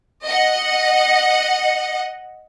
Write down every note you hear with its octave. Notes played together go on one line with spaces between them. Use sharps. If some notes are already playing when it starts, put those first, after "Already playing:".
D#5 F#5